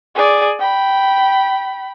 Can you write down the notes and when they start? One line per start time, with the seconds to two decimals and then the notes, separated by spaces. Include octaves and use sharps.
0.15 G#4 D5
0.59 G5 B5